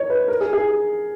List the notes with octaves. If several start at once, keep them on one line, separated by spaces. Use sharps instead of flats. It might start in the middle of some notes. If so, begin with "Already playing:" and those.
Already playing: C#5 D#5
B4
A#4
G#4
G#4